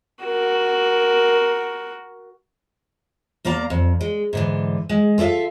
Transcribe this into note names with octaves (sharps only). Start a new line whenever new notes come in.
F#4 A#4
E2 A#3 D5 F5 A#5
F2
G#3
G#2 D3 E3
G#3
F4 A4 D5 E5 F5